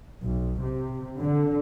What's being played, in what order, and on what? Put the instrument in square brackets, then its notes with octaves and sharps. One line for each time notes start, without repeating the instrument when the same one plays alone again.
[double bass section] B1
C3
D3